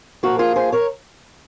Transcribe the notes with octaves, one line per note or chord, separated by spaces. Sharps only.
A#2 F3 A#3 F#4 A#4
F4 G#4
G#4 C5
A#4 C#5